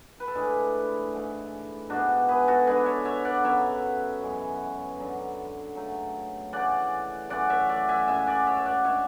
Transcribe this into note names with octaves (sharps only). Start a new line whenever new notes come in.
B4
A4
A2 G#3 D4 E4 G#4
G#2 E3 A3
G#2 G#3 B3 D4 F#4
G#4 B4
F#4 A4
D3 G#3 D4 G#4 B4
A4 C#5
C#5 E5
D5 F#5
F#2 C#3 F#3 B3 C#5 E5
F#2 E3 G#3 C#4
F#2 D3 F#3
C#3 F#3 A3
C#3 E3 A3 D5 F#5
F#2 E3 A3 C#4 D5 F#5
C#5 E5
D5 F#5
E5 G#5
F#2 C#3 G#3 E5 G#5
D5 F#5
C#5 E5
E5
D5 F#5
G#3 D4 C#5 E5